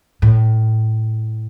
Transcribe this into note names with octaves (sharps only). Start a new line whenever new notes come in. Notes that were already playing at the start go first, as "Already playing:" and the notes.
A2